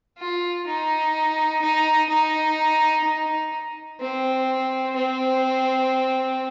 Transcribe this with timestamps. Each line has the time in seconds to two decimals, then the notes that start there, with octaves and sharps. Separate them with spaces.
0.18 F4
0.67 D#4
1.62 D#4
2.09 D#4
3.04 D#4
4.00 C4
4.95 C4